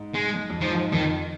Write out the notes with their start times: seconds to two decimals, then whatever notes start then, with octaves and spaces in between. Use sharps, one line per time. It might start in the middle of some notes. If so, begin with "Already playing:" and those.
Already playing: G#2
0.14 G#3
0.50 F2
0.61 G#2 F3
0.92 F2 D#3